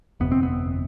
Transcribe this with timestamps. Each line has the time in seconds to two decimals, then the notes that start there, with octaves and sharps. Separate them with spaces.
0.20 G1 F2 C3 B3
0.32 C4
0.43 B3